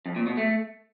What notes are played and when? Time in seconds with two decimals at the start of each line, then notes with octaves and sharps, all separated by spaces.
0.06 F2
0.16 A#2
0.27 B2
0.37 A3